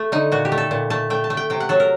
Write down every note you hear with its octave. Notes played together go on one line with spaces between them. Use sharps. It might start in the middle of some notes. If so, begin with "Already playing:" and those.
Already playing: A3
D3 D#4
A#2 F#4
G4
A3
A4
A#2
A3 A5
A3 G5
A5
A3
G5
C3 G5
F#5
F#3 A4
A#4